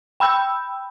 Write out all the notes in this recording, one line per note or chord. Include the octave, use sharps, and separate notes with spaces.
G5 B5 E6 G6